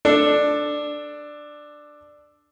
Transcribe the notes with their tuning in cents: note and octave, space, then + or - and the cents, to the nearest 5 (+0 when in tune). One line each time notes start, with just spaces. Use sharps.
D4 +10 A4 +0